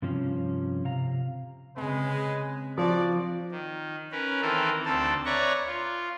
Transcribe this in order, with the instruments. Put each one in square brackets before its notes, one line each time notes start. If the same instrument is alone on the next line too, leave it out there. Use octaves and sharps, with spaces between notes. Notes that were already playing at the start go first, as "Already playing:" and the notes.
[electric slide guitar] G2 C3 F3 C#4
C3 F5 A#5
[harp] C#3 C4 [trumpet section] G#3 B4
[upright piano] F3 [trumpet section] F#4 D5
[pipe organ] D#3
C#4 A#4 B4
D#3 E3 C4 A4 A#4
D2 C4 A4 A5
B4 C#5 D5 E5 A#5 C#6
F4